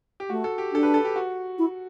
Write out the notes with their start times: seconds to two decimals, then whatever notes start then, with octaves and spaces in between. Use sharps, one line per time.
0.20 G4
0.30 A3 F#4
0.44 A4
0.58 G4
0.72 D4 A4
0.83 B4
0.94 A4
1.05 G4
1.16 F#4
1.58 E4